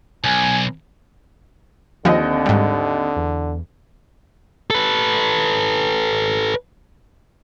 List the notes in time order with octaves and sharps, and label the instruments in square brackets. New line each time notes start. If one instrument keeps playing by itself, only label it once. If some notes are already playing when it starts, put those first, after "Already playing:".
[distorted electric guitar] B1 [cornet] G#5
[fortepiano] D#2 [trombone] D3 [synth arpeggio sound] F3 [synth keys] C4 D#5
[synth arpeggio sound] G#2 G3
[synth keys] E2
[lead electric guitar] A4 B4